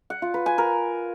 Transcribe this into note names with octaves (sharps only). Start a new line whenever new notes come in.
F#5
F4
B4
G#5
A#4